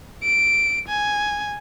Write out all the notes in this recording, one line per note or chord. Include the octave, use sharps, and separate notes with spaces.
D7
G#5